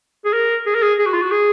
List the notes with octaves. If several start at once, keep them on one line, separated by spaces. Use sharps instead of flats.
G#4
A#4
G#4
A#4
G#4
G#4
F#4
F4
F#4
G#4